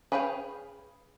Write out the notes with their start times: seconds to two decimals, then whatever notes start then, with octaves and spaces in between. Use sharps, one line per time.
0.12 G#4 B4 C#5 F5 G5